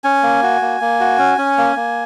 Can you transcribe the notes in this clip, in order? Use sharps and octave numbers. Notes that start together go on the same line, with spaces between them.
C#4 G#5
A#3
F#4
A#3
A#3
F#4
C#4
C#4
A#3
A#3